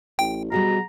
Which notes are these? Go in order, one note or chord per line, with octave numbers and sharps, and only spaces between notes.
A1 G5
B2 G3 F#4 G#4 A#5